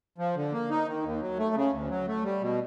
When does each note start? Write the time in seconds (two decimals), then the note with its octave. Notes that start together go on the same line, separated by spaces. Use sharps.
0.18 F3
0.36 D3
0.53 A#3
0.70 D#4
0.87 D#3
1.03 D#2
1.21 F#3
1.38 A3
1.55 C#3
1.73 D2
1.90 F#3
2.07 A3
2.24 G3
2.41 B2